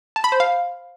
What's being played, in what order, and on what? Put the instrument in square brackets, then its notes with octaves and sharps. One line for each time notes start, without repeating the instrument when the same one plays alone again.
[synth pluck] A5
B5
C5
F5